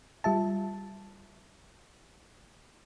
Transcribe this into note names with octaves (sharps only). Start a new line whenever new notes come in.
G3 F4 E5 A5